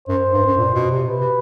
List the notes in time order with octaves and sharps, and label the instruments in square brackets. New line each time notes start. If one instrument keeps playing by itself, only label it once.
[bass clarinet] F#2 [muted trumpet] C5
[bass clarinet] G2
F#2
A#2
B2
C3
[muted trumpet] B4
[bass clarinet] C3